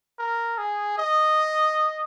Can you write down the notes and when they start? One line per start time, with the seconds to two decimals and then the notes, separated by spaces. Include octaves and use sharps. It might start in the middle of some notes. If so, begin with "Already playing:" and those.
0.19 A#4
0.58 G#4
0.98 D#5